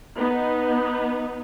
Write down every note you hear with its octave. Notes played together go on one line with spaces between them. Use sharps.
B3 D#4